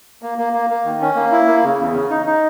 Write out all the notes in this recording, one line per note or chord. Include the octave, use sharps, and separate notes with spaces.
A#3
A#3
A#3
A#3
D#3
C#4
A#3
E4
A#3
C#3
E2
C#3
D#4
D#4